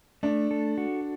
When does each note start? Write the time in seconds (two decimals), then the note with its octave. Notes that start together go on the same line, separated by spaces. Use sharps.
0.23 A3 D4
0.51 A4
0.78 F#4